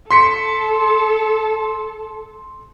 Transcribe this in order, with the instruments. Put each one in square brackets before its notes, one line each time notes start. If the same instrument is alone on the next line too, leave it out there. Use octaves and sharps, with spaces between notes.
[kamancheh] A4 [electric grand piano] C6 B6 C#7